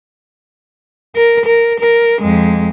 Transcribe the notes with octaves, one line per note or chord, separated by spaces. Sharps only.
A#4
A#4
A#4
F2 G#3